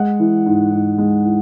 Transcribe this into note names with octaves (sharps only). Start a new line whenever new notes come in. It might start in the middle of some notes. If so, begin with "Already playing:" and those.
Already playing: G#3 F#5
E3
G#2
G#2
G#3
E3